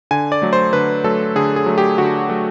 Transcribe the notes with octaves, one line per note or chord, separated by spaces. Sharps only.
D3 G#5
D5
F#3 A3
C5
D3 B4
F#3 A3 A4
D3 G#4
G#4
F#3 A3
G4
D3 F#4
F#3 A3